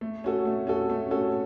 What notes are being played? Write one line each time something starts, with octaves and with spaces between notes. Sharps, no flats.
A3
C#4 F#4 A4
A3
C#4 F#4 A4
A3
C#4 F#4 A4